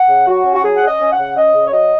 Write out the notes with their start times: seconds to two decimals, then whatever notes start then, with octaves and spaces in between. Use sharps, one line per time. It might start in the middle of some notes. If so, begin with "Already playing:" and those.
Already playing: F#5
0.08 C#3
0.27 F#3 F#4
0.44 C#4
0.54 F#4
0.62 F#3 G#4
0.76 F#5
0.81 C#4
0.87 D#5
0.99 C#4
1.12 F#5
1.18 C#3
1.36 C#4 D#5
1.54 C#3
1.67 C#5
1.72 F#3 D#5